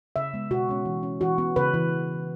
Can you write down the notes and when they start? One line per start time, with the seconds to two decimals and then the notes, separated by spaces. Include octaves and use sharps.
0.16 C#3 E5
0.34 G#3 B3
0.51 B2 F#4
0.69 G#3 C#4
0.85 E3
1.03 C#4
1.21 E3 F#4
1.38 B3
1.56 C#3 B4
1.74 E3